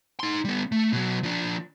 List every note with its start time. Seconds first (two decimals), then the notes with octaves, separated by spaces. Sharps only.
0.20 D#4 C6
0.45 G3 B3
0.72 A3
0.93 B2 F#3
1.23 F3 D4